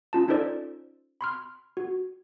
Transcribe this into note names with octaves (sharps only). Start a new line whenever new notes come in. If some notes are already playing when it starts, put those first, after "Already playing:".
C#4 F4 A5
C#4 D#4 F4 A4 C5 D5
B5 C6 F6
F#4